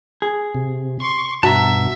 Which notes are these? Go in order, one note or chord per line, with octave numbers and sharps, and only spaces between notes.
G#4
C3
C6 C#6
G2 B2 F#4 E5 A5 A#5